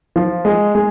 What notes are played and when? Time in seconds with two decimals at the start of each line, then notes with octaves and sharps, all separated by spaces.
0.16 F3
0.45 G#3
0.75 G#3